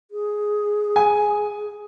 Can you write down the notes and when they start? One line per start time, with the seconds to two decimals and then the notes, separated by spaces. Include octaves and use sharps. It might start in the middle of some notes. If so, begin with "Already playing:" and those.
0.11 G#4
0.96 G#5